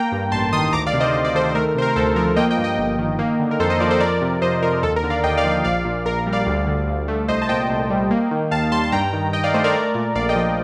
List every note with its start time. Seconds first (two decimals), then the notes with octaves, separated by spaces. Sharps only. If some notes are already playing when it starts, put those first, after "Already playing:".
Already playing: A#3 G5 A#5
0.12 G2
0.32 A1 A5 C6
0.53 D#3 C6 D#6
0.73 D2 A#5 D6
0.86 D5 F5
0.93 C3
1.00 C5 D#5
1.14 D2 C5
1.25 D5
1.34 D#3 A4 C5
1.50 C5
1.55 A3 A#4
1.69 A#4
1.75 C3 C5
1.82 A#4
1.96 D2 A4 C5
2.16 F3 A#4
2.36 A#3 D#5 G5
2.51 D#5 G5
2.57 G2
2.64 D#5 G5
2.78 G1
2.99 D#3
3.19 A#3
3.39 D3
3.51 A#4
3.60 F2 A4 C5
3.70 C5 D#5
3.80 F3 A#4 D5
3.91 A4 C5
4.00 F2 A#4 D5
4.21 C3
4.42 F2 C5 D#5
4.62 F3 A#4
4.83 D#2 A4
4.96 A#4
5.03 D3
5.10 D5 F5
5.24 D#2 D#5 G5
5.37 D5 F5
5.44 F3
5.51 D5 F5
5.64 A#1 D5 F5
5.85 A#2
6.05 A#1 A#4
6.19 A#4
6.26 G3
6.33 D5 F5
6.47 D2
6.67 D3
6.87 D2
7.08 A3
7.28 C2 C5 D#5
7.42 A5
7.49 A#2 D#5 G5
7.70 C2
7.90 G3
8.11 A#3
8.31 D#3
8.51 D#2 F5 A5
8.72 G3 A5 C6
8.84 A5
8.92 G2 G5 A#5
9.13 D#3
9.33 G2 D#5 G5
9.44 D5 F5
9.54 A3 C5 D#5
9.64 A#4 D5
9.74 A3
9.95 A#2
10.15 A#1 D5 F5
10.29 D#5 G5
10.36 F3